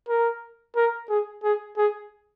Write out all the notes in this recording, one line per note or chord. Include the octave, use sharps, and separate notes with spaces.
A#4
A#4
G#4
G#4
G#4